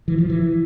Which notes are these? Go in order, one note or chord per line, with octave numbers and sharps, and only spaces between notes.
E3
F3
E3